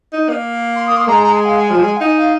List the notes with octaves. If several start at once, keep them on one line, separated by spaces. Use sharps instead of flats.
D#4
A#3
C6
D#6
C6
G#3 A#5
A#5
G#5
F5
G#5
F3
G#3
F5
D#4 G#5
F5